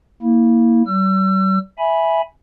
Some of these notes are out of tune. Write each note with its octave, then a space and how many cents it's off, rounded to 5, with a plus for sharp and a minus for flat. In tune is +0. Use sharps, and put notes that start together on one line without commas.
A#3 +0 E4 -20
G3 -45 E6 +35
E5 +0 G#5 +5 B5 -10